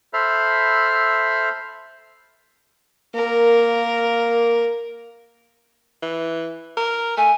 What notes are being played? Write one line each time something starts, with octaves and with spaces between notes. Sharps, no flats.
A4 C5 E5 B5 F6
A#3 A#4
E3
A#4
A3 G#5